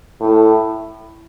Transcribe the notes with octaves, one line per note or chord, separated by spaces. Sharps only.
A2